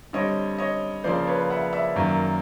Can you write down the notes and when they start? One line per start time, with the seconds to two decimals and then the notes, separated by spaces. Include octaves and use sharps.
0.13 D3 G3 C4 C#5 D#5
0.58 C#5 D#5
1.04 C#3 F3 A#3 C5 D5
1.27 B4 C#5
1.50 E5 F#5
1.73 D5 E5
1.95 F#2 D#3 F#3 A#3